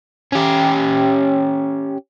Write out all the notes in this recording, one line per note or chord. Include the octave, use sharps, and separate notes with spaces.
C#4 G4